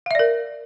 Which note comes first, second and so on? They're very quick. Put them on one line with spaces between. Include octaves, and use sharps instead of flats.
F5 E5 D5 A#4